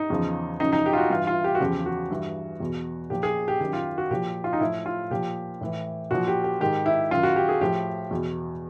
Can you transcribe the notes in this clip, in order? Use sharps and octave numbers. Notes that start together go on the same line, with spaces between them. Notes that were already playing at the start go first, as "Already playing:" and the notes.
Already playing: D#4
E2 C#3 F3
F#2 C#3 F3 D#4
D#4
G4
F4
F#4
G2 E3 F4
F4
G4
F#4
E2 C#3 F3 G4
F#4
G2 E3
E2 B2
A#2 F3 G4
G#4
G4
F#2 D#3 G4
F4
F#4
A#2 F3 G4
F4
D#4
A2 F3 E4
F4
A#2 F3 G4
A2 E3
A#2 F3 F#4
G4
G4
G#2 D#3 G4
E4
F#2 D#3 F4
F#4
G4
G#4
A2 F3 G4
E2 B2